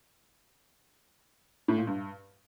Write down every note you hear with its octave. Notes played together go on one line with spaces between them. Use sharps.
A2
A#2
G2